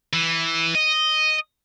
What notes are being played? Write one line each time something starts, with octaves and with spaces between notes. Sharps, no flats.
E3
D#5